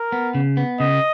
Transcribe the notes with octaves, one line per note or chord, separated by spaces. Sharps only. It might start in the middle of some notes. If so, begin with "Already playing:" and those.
Already playing: A#4
B3
C#3
B3
C#3 D#5